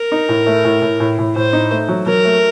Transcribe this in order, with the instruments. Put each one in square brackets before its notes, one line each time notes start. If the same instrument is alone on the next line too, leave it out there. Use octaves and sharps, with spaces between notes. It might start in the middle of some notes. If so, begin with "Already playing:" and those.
Already playing: [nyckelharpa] A#4
[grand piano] D#4
A2
A3
A2
A2
A2
A2
[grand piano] A2 [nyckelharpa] C5
[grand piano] D#4
A3
F#3
[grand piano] F#3 [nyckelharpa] A#4
[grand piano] A3